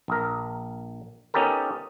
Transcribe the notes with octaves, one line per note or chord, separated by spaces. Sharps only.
A#1 A#4
B3 C#4 D#4 G4 A4 A#4